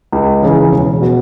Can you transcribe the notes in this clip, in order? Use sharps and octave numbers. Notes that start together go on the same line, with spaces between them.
C#2
C#3 E3
E1
B2